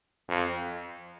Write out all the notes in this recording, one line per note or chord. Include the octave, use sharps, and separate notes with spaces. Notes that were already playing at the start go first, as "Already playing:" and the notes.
F2